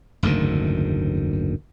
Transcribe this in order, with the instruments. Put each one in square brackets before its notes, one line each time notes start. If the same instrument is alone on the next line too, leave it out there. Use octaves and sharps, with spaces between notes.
[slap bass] F#1 D2 G#2 D#3